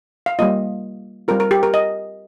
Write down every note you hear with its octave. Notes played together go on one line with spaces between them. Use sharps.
F5
G3 A#3 F4 D#5
G3 C4 F4 A#4
A#4
G4
A#4
D#5